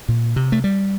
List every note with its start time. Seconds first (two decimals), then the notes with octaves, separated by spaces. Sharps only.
0.09 A#2
0.36 C3
0.52 A3
0.64 G3